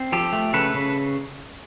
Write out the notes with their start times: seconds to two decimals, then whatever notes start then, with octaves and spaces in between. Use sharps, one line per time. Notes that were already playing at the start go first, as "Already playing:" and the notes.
Already playing: C4
0.12 F3 G4 A4
0.33 A3
0.53 C#3 A4 B4
0.74 C#3